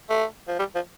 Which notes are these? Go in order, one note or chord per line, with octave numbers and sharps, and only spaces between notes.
A3
F3
G3
F3